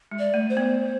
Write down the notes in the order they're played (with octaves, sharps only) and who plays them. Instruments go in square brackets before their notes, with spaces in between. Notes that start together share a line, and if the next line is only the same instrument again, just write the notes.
[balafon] G#3
[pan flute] D5
[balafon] A3
[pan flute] C5
[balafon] B3